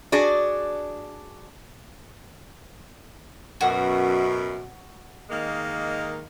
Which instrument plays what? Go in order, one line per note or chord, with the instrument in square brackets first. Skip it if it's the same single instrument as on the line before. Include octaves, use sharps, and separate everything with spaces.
[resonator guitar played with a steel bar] D4 F#4 G#4 D5
[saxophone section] F#2 B2 [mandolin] F#4
[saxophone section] D#3 G#3 A#3